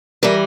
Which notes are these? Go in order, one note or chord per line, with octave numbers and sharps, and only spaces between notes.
E3 G3 A#4